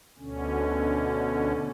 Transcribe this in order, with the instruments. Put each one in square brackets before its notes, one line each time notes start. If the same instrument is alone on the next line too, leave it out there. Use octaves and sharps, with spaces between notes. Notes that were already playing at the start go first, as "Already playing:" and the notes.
[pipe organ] D2 B2 D3 C#4